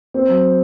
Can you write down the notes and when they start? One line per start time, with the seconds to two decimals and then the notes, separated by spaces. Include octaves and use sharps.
0.14 C4
0.29 F#3